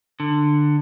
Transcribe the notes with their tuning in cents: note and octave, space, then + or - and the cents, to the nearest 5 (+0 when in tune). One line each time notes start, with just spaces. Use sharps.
D3 +15